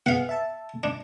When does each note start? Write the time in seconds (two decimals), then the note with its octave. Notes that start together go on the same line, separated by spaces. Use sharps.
0.06 B3 G#4 F5 F#5
0.29 E5 A5
0.83 D4